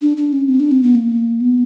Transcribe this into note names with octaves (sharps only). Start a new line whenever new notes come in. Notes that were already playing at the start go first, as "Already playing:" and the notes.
D4
D4
C#4
C4
D4
C4
B3
A#3
B3